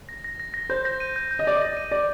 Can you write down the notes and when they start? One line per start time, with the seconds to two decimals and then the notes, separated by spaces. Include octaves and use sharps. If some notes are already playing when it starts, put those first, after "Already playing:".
0.09 A#6
0.24 A#6
0.40 A#6
0.54 A#6
0.69 C5 G6
0.85 A#6
1.00 D#7
1.16 G6
1.31 G6
1.39 D#5
1.47 D5 A#6
1.56 D#5
1.62 A#6
1.77 D#7
1.91 D5 A#6